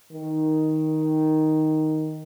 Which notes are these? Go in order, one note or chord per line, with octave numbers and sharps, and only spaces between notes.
D#3